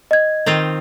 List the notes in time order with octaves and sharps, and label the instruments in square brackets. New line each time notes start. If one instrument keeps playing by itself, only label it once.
[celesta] D#5 G#6
[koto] D#3 C4 F4